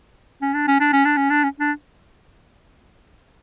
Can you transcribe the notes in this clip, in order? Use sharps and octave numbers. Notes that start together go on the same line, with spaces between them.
C#4
D4
C#4
D4
C#4
D4
C#4
D4
C#4
D4